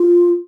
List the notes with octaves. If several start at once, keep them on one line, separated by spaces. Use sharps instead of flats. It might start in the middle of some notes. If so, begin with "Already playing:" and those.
Already playing: F4